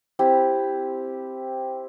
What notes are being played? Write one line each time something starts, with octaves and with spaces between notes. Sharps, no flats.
C4 E4 G4